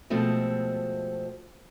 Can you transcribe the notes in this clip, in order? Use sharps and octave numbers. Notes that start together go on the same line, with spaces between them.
B2 F3 G#3 A3 C4